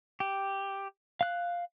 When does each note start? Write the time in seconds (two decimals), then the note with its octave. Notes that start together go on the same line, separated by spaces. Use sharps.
0.20 G4
1.21 F5 F#6